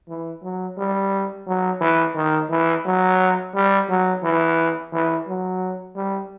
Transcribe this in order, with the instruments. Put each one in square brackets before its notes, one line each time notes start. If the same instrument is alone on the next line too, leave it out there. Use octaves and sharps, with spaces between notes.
[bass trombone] E3
F#3
G3
F#3
E3
D#3
E3
F#3
G3
F#3
E3
E3
F#3
G3